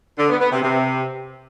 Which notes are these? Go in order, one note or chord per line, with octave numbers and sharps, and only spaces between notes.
D3
B3
B3
C3
C3